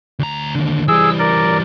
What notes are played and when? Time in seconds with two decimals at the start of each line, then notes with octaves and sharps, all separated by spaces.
0.19 D2 A#5
0.55 D#2 D3
0.88 E3 G3 G#4 E6
1.19 A#4 D5